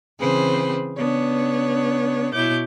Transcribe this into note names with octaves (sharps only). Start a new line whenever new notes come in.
C#3 E3 C4 G#4 B4 C5
C#3 B3 D4 C#5
B2 E4 C#5 D6 G6